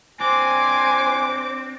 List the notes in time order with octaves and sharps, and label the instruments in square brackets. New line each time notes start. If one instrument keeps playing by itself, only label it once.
[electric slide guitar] C4 D4 [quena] C5 [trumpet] G#5 [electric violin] D6